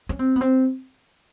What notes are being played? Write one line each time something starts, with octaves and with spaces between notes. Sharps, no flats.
C#4
C4
B3
C4